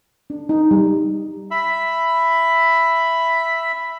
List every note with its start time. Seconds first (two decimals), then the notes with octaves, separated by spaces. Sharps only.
0.30 D4
0.49 D#4
0.71 G3
1.51 E5 B5